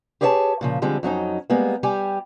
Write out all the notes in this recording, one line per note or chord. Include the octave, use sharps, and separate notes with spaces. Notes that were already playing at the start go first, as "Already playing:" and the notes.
G4 G#4 B4 C#5 F5 A5
A#2 C#3 F3
D3 F3 G3 G#3 C4
F2 F#3 C#4 D#4
G3 G#3 A#3 B3
G3 G4 G5 G#5